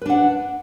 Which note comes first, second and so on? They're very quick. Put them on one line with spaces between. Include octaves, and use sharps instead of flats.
B4 D4 F#5